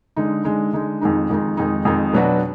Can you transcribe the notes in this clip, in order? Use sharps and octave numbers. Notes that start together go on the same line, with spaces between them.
D3 G#3 D#4
D3 G#3 D#4
D3 G#3 D#4
F2 D#3 G#3 D#4
F2 D#3 G#3 D#4
F2 D#3 G#3 D#4
F2 D#3 G#3 D#4
B2 F#3 D4 F#4 B4